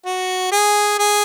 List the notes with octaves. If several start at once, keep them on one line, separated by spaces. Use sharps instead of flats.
F#4
G#4
G#4